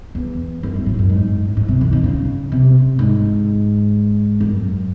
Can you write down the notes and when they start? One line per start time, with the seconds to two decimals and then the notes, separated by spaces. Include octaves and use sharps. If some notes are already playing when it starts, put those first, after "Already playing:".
0.15 E2
0.63 F#2
0.74 G#2
0.86 A2
0.99 F#2
1.09 G#2
1.48 G#2
1.57 A2
1.69 C3
1.81 E3
1.93 D#3
2.04 C#3
2.52 C3
2.99 G#2
4.40 F#2